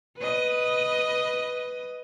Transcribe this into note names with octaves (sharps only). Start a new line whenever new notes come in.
B4 D#5